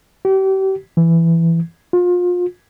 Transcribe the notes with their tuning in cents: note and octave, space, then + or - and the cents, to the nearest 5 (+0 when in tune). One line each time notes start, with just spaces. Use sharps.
G4 -35
E3 +10
F4 +30